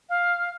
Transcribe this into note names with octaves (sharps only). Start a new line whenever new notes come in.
F5